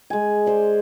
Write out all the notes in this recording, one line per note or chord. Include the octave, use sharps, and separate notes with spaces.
G#3 G#5
C5 D5